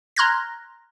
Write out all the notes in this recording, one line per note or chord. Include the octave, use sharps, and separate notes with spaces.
A#5 C6 F6 F#6 G#6 A#6